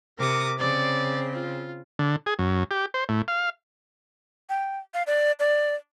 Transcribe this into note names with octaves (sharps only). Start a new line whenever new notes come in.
C3 A#4 D6 D#6
C#3 C4 D5
F4
D3
G#4
F#2
G4
C5
A2
F5
G5
F5
D5
D5